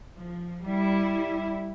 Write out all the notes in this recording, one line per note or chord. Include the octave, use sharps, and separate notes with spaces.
F3
G3 E4